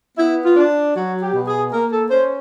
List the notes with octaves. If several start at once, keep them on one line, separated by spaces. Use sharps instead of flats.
B3 E4
F4
D4
F#3 F#4
G4
B2
G#4
A#3 A#4
A4
C#4 C5